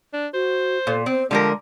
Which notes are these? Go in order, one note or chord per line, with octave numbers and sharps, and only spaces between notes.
D4
F#4 C5
A#2 A4
C4 C5
D3 F3 G3 G#3 A#4